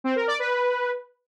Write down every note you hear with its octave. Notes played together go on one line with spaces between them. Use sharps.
C4
A#4
D5
B4